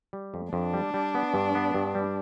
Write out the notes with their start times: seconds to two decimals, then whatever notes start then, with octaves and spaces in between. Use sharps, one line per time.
0.13 G3
0.34 F2
0.53 F2 D4
0.74 G3
0.94 G3
1.15 B3
1.34 G2
1.55 B3
1.74 G2
1.95 G3